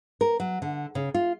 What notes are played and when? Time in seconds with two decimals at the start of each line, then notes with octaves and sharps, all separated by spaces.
0.21 A#4
0.40 F#3
0.62 D3
0.95 C#3
1.14 F4